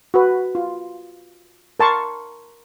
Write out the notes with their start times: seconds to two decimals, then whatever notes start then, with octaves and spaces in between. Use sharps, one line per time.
0.14 F#4 B4
0.55 F4
1.80 A#4 A5 C6 C#6